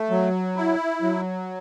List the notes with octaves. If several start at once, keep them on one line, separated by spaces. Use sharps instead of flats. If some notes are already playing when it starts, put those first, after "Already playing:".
Already playing: A3
F#3
E4
F#3